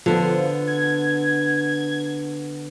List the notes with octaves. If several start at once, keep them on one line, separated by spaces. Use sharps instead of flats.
D3 F3 B3
G#6